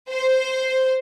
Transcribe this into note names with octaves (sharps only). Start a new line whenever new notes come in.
C5